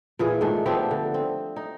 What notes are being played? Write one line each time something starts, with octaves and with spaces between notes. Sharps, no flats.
A#2 E3 G#4
G#2 D#3 A3 D4
F3 B3 C4 G4
D3
C4
D#4